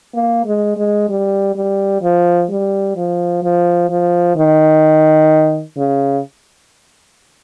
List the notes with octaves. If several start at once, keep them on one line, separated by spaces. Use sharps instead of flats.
A#3
G#3
G#3
G3
G3
F3
G3
F3
F3
F3
D#3
C#3